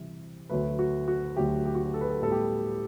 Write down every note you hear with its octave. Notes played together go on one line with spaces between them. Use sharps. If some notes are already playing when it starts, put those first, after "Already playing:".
Already playing: C3 E3 G3
D2 D3 F#3 A3 B4
F#4
F#4
D2 D3 F#3 A3 G4
G4
F#4
G4
A4
B4
A4
A2 G3 B3 A4
G4